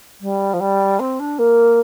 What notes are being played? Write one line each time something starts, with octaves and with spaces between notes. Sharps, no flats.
G3
F3
G3
C4
D4
A#3